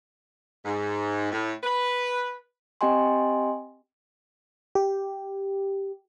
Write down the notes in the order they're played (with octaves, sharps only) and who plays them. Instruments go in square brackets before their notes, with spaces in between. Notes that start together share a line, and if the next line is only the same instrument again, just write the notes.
[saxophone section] G#2
A2
B4
[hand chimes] C4 G4 D#5 G5 G#5 C6
[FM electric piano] G4